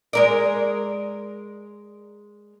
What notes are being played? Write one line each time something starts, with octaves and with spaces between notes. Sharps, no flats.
G#3 A#4 D5